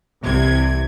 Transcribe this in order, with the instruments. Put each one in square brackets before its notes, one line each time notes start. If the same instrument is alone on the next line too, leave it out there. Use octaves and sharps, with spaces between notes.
[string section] C2 C3 E3 G#6